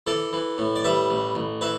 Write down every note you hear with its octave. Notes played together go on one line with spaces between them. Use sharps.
E3 A4 D5
E3
A2
D5
G3 B4 E5
A1
A1
E3 B4 E5